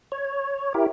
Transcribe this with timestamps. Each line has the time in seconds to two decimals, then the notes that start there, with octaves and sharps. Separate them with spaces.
0.12 C#5
0.74 E4 G4 A#4